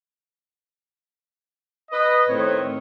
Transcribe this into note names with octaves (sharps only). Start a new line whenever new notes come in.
B4 D#5
A2 D#3 C4 C#5